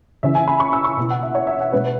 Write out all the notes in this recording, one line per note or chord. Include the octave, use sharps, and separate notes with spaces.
C#3 E3 C#4 E5
G#5
B5
C#6
E6
C#6
B2 B3 E4
F#5
E5
C#5
E5
F#5
B2 G#3 B3 B4
B4